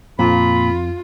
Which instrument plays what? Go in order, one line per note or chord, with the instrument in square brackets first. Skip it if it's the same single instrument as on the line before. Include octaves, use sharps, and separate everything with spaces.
[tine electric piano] F2 [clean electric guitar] A#2 [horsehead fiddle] F4 [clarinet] B5